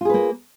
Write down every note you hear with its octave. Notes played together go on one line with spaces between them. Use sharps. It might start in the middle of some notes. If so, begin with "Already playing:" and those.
A#3 F4 G#4 B4